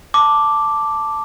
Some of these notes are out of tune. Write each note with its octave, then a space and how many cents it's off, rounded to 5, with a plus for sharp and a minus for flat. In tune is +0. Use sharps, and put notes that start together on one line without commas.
A5 +5 D6 +0